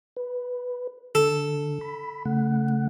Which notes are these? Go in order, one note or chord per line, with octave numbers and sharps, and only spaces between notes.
B4
D3 A4
B5
C#3 A3 F#5